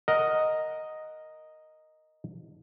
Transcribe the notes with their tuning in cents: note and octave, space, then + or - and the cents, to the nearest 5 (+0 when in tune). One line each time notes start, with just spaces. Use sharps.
A#4 +0 D#5 +0 F#5 +0